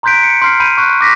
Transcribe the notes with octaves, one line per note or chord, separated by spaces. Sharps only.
A#5 C6 F#6 G6 B6 D7
C#7
C6 F6 C7
B5 G6 D#7
C#6 F#6
D6 A#6 B6